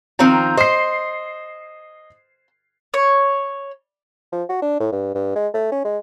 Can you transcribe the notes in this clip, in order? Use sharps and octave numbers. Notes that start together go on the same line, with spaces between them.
D#3 F3 C4 A#5
C5 D#5 C7
C#5
F3
F#4
D4
A2
G2
G2
G#3
A3
C#4
G#3